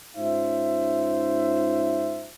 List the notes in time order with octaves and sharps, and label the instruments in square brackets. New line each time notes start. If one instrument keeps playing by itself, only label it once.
[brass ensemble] G#2 C#4 D#4 F4 C5 E5